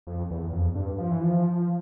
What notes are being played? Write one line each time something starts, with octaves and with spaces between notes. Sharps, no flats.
F2
E2
F2
G2
F3
E3
F3